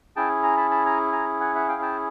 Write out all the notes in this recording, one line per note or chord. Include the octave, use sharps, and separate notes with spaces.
C#4 E4 G#4 G5 A5
G#5 A#5
A5 B5
A5 B5
G#5 A#5
G#5 A#5
F#5 G#5
E5 F#5
F5 G5
G5 A5